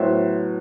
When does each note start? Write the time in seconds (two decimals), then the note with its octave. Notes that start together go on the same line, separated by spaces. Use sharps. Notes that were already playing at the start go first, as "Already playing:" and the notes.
Already playing: A2 F#3 B3 C5 E5